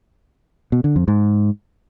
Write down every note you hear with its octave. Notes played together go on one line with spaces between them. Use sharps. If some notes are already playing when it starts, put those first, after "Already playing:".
B2
D3
F2
G#2